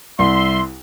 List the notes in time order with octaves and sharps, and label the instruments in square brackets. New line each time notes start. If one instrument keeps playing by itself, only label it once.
[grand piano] C2 [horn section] E5 C6